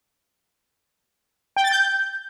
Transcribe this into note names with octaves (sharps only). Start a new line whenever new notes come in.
G5
A6
G6